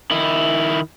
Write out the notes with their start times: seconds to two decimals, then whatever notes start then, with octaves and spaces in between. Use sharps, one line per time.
0.11 D#3 E4